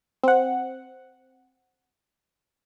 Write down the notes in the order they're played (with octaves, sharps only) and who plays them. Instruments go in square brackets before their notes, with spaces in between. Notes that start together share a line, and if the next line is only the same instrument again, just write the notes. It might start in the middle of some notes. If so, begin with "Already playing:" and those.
[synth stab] C4 F#5